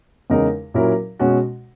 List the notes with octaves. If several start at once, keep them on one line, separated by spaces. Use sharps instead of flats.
E2 C#3 G#3 D#4 A#4
A#2 F#3 C#4 E4 A#4
B2 G#3 C#4 F#4